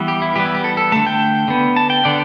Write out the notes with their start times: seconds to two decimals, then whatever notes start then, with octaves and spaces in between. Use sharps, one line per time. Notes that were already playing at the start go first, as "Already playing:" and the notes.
Already playing: E3 G3 B3
0.08 G4
0.22 E4
0.36 E3 G3 B3 G4
0.45 E4
0.55 G4
0.64 A4
0.77 A4
0.92 D3 A3 A5
1.07 G5
1.48 D3 B3
1.76 A5
1.90 G5
2.04 D3 B3 D5